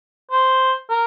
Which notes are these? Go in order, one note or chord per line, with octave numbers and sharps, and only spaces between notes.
C5
A#4